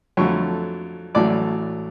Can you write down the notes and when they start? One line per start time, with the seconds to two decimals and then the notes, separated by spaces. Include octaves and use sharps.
0.17 F2 D3 F#3 A3 C#5 C#6
1.15 A1 A2 F#3 A3 D5 D6